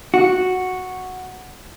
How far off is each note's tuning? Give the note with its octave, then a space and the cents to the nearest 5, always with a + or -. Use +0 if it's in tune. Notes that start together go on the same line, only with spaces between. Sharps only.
F#4 -5